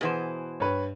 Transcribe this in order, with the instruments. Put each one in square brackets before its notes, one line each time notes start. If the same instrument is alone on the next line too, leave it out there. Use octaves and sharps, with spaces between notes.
[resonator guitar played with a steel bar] B2 E3 C5 [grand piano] G#4 B4 F#5
[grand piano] G2 [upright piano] B4 C#5